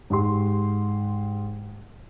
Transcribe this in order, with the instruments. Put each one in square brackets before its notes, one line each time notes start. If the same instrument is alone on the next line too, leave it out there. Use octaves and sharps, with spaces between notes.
[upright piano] G#2 G4 C6